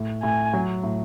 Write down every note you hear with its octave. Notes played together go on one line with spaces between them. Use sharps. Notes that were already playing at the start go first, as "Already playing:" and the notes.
Already playing: A2
A2 G#5
F#3
A2